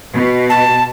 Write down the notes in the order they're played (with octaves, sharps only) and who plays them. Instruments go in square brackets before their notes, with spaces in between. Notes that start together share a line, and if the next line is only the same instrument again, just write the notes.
[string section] B2
[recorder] A5